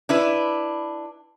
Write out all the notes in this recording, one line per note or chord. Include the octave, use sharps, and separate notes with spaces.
D4 E4 B4